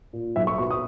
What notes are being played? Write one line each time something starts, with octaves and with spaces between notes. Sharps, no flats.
A#2
B1 E5
C#6
B2 C#6
D#6